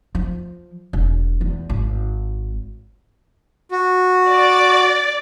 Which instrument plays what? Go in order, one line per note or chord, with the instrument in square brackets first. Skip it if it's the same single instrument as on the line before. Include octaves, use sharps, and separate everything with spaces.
[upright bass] F3
E1
E2
G#1
[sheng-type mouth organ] F#4
[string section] D5